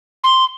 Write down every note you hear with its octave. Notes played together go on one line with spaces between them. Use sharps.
C6